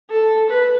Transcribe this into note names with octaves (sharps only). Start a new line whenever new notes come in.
A4
B4